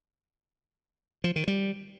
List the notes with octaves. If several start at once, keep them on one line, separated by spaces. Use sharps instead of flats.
F3
D#3
G3